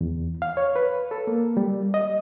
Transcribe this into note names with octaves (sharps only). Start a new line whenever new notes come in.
E2
F5
C#5
B4
A4
A#3
G3
D#5